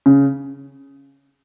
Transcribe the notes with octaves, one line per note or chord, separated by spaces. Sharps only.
C#3